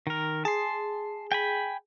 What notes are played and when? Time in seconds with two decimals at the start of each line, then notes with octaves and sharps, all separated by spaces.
0.07 D#3 A#4
0.45 G#4 A5 C6
1.32 G5 G#5 B5